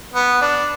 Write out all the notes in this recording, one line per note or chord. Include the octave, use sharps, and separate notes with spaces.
B3
D4